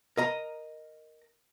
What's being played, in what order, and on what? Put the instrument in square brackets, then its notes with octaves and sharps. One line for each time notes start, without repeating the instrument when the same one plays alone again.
[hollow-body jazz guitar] A#4 D#5 A#5